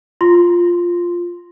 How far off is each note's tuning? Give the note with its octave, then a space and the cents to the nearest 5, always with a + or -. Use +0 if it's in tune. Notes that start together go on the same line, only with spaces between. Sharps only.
F4 +0 C6 +0